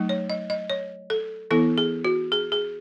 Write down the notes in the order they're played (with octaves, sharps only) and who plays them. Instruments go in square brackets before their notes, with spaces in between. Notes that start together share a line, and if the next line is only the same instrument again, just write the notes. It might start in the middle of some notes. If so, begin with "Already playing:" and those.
Already playing: [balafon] F#3 A3 D#4
C#5
D#5
D#5
C#5
A4
E3 B3 E4 A4
G#4
F#4
G#4
G#4